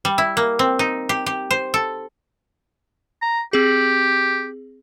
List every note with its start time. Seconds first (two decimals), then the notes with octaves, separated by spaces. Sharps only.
0.05 G3
0.18 E4
0.37 A#3
0.59 C4
0.79 D#4
1.09 G4
1.26 G4
1.51 C5
1.74 A4
3.22 A#5
3.53 C4 G4 G#4